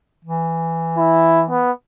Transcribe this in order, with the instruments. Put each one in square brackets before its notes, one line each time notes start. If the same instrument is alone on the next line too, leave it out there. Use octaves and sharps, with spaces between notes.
[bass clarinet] E3
[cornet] E4
B3